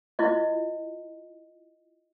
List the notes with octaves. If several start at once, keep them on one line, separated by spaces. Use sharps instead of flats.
E4 F4 D#5